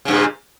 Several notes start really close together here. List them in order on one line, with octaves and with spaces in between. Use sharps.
C#3 G2 A#2